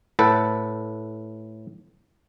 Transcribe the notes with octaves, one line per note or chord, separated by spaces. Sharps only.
A2 A4 B4 F#5